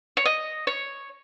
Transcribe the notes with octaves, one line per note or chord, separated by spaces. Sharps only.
C#5
D#5
C#5